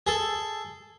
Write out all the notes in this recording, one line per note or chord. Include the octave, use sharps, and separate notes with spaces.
G#4 A4